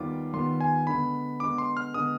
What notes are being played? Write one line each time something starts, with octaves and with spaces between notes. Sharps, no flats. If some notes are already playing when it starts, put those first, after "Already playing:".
Already playing: D#2 D#3 G3 B3 F4 D6
D#2 D#3 G3 B3 F4 C6
G#5
D3 G#3 B3 B5
D3 G#3 B3 D6
C6
F6
D3 G#3 B3 D#6